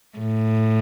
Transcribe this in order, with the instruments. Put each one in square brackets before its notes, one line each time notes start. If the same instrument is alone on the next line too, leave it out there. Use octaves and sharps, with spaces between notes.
[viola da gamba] A2